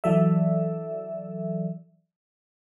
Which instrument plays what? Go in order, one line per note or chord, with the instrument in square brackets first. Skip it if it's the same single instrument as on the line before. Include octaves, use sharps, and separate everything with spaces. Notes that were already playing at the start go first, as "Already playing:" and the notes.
[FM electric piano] E3 F#3 A4 D5 E5